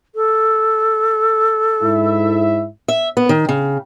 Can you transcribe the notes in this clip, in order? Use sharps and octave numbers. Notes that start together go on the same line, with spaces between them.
A4
G#2 E4 E5
E5
B3
D#3
C#3